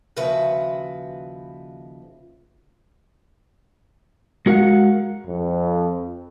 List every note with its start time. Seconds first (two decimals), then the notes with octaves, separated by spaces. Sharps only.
0.16 D#2 C#3 F3 F#4 B4 E5
4.46 G#3 F#4 A#4 F5 F#5
5.27 F2